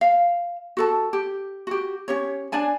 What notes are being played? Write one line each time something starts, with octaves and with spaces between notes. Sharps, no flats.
F5
F#4 A4 A5
G4
F#4 G4
C#4 G4 C#5
D4 D5 G#5 A5